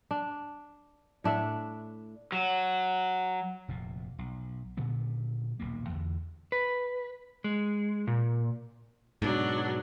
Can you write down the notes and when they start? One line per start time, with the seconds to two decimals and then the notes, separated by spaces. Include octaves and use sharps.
0.11 D4
1.24 A2 D4 E5 F#5
2.32 F#3
3.68 F1 A#2
4.19 B1
4.77 A#2 D3 F#3 B3
5.60 D#1 B1 B2 A#3
5.89 E2 D3
6.52 B4
7.44 G#3
8.07 A#2
9.22 G#2 B2 F#3 D4